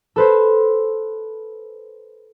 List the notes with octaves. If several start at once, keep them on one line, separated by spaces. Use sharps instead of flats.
A4 B4 C5